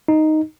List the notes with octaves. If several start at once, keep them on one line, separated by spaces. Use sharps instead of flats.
D#4